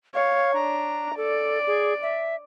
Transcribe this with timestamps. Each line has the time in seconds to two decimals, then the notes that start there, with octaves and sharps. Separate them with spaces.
0.15 C#5 F5
0.54 D4 A#5
1.17 A4 D5
1.67 G#4
2.03 E5